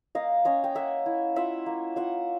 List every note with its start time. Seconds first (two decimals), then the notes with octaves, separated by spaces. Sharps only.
0.15 A#3 D#5 F5
0.45 C#4 C#5 D#5
0.64 G5
0.75 A#3 E5 F#5
1.06 E4
1.36 F4 E5 F#5
1.66 A#3
1.96 F4 E5 F#5